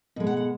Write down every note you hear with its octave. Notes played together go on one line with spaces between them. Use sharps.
B2 G#3
F#5
F#5